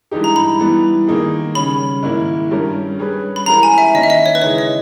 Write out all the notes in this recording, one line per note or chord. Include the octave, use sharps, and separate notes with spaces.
G2 E3 G#3 D#4 G4
A#5
B5
E3 G3 B3
D#3 A#3 D#4 G#4
C#3 G3 C#4 B5
G#2 D#3 A#3 E4
G2 G3 C#4 G4 A#4
G3 C#4 G#4 B4
B5
E3 G#3 C#4 G4 A#4 A#5
G#5
E5
D#3 A#3 C#4 D#5
E5
D#5
C#5
B4
C#3 E3 G#3 D#4 G#4 C#5
D#5